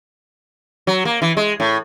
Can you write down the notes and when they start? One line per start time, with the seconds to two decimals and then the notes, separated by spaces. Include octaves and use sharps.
0.87 F#3
1.05 A#3
1.22 E3
1.37 G#3
1.60 A2